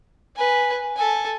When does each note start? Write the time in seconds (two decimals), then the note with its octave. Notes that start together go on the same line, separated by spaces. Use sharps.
0.36 B4 G#5
0.96 A4 G#5